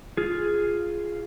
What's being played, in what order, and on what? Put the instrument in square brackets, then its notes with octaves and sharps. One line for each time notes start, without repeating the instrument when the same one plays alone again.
[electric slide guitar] F4 G#4